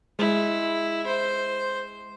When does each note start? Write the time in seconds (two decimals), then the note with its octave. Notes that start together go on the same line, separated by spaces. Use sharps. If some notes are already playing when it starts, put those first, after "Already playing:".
0.19 G#3 E4
1.06 C5